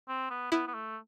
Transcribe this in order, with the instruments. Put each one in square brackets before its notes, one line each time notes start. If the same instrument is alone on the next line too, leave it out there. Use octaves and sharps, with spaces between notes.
[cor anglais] C4
B3
[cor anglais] B3 [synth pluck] E4
[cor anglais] B3
A3